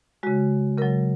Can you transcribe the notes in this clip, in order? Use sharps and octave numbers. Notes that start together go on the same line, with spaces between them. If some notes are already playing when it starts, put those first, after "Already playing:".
C#3 G#3 F#4
C#3 F#3 A#4